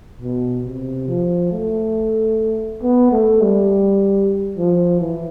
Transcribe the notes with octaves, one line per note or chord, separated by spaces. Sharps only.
B2
C3
F3
A3
B3
A3
G3
F3
E3